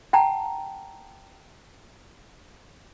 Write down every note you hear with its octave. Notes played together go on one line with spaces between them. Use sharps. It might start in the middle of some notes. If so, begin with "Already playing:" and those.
F#5 G5 A5 A#5